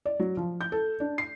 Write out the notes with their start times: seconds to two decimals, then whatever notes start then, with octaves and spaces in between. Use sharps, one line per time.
0.06 D5
0.20 F#3
0.37 F3
0.61 G6
0.72 A4
1.00 D4
1.18 C7